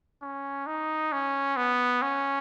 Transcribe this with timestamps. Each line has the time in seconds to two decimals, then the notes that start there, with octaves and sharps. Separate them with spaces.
0.22 C#4
0.67 D#4
1.12 C#4
1.56 B3
2.02 C#4